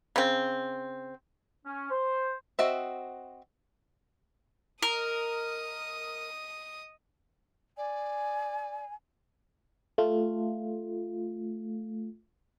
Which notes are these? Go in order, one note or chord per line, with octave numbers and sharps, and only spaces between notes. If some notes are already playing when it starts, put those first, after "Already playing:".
C#3 C4
C#4
C5
C4 F#4 D#5 E5
A#4 D#5 D#6
D5 G#5
A3 F4